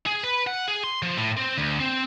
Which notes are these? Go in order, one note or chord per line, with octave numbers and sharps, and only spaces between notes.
G#4
B4
F#5
G#4
C6
F3
A2
C4
D2
C4